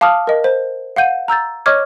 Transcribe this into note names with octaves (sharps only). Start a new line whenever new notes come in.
F5 A5 D6 D#6 F6
A#4 D#5
C5
F5 F#5 G6 D#7
A#5 E6 G6 A6
C#5 D#5 C#6 D6 F6 G#6